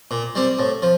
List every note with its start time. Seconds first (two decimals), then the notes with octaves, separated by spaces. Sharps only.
0.11 A#2
0.35 G3 C4
0.59 A2
0.82 F3